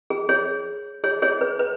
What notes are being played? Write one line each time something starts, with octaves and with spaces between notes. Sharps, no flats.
G#4
G#4 C#5
G#4 C#5
G#4 C#5
B4
B4